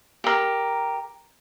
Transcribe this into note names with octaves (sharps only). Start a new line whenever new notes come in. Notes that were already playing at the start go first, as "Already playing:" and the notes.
G4 A#4